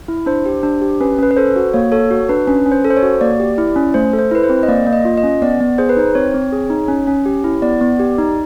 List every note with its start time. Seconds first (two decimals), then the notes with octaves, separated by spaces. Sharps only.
0.08 E4
0.26 D4 C5
0.46 G4
0.63 D4
0.82 G4
1.01 C#4 B4
1.19 C#4 B4
1.31 B4
1.37 A4 C5
1.56 F#4
1.73 A#3 C#5
1.92 A4 C#5
2.11 F#4
2.29 D4 B4
2.47 C#4 B4
2.66 C#4
2.72 C5
2.84 A4
2.90 C5
2.97 C#5
3.03 F#4
3.21 A#3 D5
3.40 G4
3.58 E4
3.76 C#4
3.94 A3 C5
4.13 A4
4.19 C5
4.31 E4 B4
4.43 C5
4.50 C4
4.63 D#5
4.68 A#3 D5
4.87 A#3
4.93 D#5
5.05 F4
5.17 D#5
5.23 C#4
5.42 B3 D5
5.60 B3
5.78 G#4 C5
5.89 B4
5.97 D#4 C5
6.15 C4 C#5
6.34 C4
6.52 G#4
6.70 D#4
6.88 C#4
7.07 C#4
7.26 G4
7.44 E4
7.62 B3 D5
7.81 B3
8.00 G4
8.18 D#4